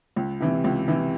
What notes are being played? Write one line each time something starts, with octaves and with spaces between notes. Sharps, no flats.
C#2
C3 E3
C#2
C3 E3